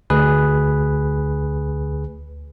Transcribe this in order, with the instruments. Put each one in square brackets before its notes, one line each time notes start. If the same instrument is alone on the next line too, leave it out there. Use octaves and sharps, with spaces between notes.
[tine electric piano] D2 G#4 B4